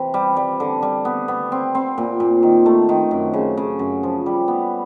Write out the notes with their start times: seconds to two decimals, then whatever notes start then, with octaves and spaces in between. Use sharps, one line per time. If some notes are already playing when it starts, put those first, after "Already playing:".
Already playing: C3 E3
0.14 G3
0.37 G3
0.60 D3
0.83 G3
1.05 B3
1.28 B3
1.52 C4
1.75 C4
1.98 A#2
2.20 A#2
2.43 D#3
2.66 A3
2.89 D#3
3.11 F#2
3.34 C#3
3.57 C#3
3.79 F#2
4.03 F3
4.26 G3
4.48 B3